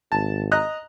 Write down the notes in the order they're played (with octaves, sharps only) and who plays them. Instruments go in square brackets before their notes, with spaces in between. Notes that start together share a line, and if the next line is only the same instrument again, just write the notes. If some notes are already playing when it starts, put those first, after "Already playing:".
[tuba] G#1 [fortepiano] A5
[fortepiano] D#5 A#5 F#6